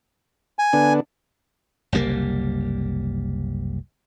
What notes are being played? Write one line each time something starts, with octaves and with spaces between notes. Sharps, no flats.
G#5
D3 B3 D4
F#1 C2 G3 A#3